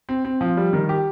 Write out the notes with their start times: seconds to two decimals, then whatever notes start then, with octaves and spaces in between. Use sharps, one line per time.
0.09 C4
0.25 C4
0.41 F3
0.57 G3
0.73 D#3
0.89 G4